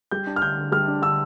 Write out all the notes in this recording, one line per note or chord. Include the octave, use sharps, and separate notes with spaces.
G3 G6
D4
F6
D3 G6
D3
G3 F6
D4
D3 E6